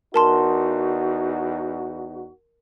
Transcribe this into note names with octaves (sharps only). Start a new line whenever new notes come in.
E2 D#4 F#4 A#4 A5 C6